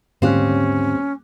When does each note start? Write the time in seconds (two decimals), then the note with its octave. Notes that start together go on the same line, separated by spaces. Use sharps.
0.22 D#1 G#2 D3 C4 C#4 G4 F5 F#6